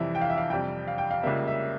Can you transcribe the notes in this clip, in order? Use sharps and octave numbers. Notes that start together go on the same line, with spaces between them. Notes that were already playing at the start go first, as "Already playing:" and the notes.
Already playing: F2 C3 E3 G3 E5
G5
F5
E5
F5
F2 C3 G3 G5
F5
G5
F5
C#2 C#3 G3 A#3 E5
E5